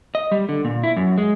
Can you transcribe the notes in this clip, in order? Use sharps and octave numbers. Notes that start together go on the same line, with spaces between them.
D#5
G3
D3
A#2
E4
F#2
G#3